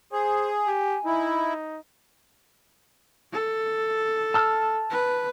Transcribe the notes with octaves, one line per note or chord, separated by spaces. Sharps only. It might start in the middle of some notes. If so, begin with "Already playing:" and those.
G#4 C5 G#5
G4
D#4 E4
A4
A5 E6 F6
B4